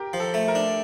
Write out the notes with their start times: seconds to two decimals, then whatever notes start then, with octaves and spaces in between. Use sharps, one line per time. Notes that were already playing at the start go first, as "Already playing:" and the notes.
Already playing: G4 A#4
0.13 F3
0.20 A4
0.34 A3
0.48 A#4
0.55 D4